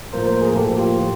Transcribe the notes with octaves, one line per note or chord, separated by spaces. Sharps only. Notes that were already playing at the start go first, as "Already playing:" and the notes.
A2 F3 A#3 A#4 C5
A#4 C5
G#4 A#4
A2 F3 A#3 G4 A4
F4 G4